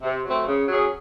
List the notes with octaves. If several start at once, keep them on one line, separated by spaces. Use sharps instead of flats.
C3
F#3 A3 C4
C#3
F#3 C#4 G#4